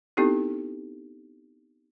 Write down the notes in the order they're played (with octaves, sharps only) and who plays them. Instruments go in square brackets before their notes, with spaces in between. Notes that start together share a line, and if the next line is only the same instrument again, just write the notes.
[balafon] B3 C4 D#4 E4 G4 A4